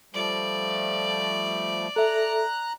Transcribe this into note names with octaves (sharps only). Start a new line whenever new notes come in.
F3 G3 A3 D5
A4 E5 A#5 F#6